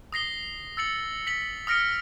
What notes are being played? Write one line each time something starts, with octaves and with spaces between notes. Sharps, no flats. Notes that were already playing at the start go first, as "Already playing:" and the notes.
D#6 A#6 C7 G7
E6 A6 C#7 F#7
B6 F#7
D#6 F6 A#6 C#7 D7